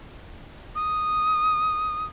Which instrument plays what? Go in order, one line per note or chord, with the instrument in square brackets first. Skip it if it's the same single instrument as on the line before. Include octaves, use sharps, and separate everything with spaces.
[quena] D#6